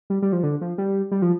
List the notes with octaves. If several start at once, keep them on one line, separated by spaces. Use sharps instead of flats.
G3
G3
F3
D3
F3
G3
G3
F3